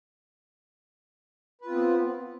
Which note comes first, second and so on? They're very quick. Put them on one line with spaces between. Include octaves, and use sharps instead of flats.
B4 F4 C4 B3